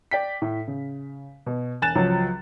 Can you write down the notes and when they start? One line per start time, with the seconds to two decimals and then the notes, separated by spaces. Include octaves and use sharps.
0.11 D5 G5 B6
0.42 A2
0.68 C#3
1.46 B2
1.82 E1 G#5 F#6 A6 E7
1.95 C#2 F3 F#3